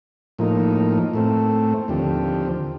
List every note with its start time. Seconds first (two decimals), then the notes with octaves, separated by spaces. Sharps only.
0.39 A2 F3 A#3 D#4
1.13 A2 A3 C4
1.88 D#2 D3 F3 C4 G4